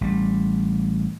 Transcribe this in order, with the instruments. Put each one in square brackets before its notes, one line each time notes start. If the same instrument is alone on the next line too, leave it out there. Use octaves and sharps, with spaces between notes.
[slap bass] A1 G3